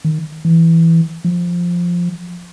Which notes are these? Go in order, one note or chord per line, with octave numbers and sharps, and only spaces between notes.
D#3
E3
F3